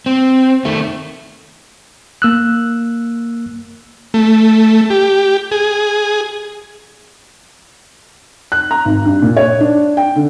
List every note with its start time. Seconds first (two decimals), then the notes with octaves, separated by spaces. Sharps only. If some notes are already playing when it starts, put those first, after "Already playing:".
0.06 C4
0.65 D#3 A3
2.22 A#3 E6 F#6
4.14 A3
4.90 G4
5.51 G#4
8.52 F#6
8.71 A#5
8.85 G#1
9.05 G2
9.22 A#2
9.37 C#5
9.60 D4
9.97 G5
10.16 D3